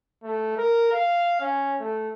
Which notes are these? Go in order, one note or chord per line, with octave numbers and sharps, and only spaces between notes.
A3
A#4
F5
C#4
A3